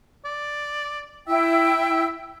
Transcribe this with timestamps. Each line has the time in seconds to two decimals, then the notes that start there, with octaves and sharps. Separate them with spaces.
0.25 D5
1.28 E4 E5 G5